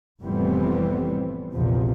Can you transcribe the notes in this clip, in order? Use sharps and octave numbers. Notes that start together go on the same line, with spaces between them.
F1 A2 E3 G3 B3 C4
A#1 E2 C3 F3